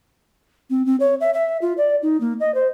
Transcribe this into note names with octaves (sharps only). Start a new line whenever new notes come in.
C4
C4
C#5
E5
E5
F4
D5
D#4
A#3
D#5
C5